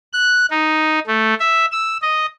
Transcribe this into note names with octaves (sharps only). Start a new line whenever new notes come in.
F#6
D#4
A3
E5
E6
D#5